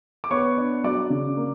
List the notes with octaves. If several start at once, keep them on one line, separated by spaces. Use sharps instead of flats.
D6
B3 C#5 C#6
D4
F#3 D5 D6
C#3
A#3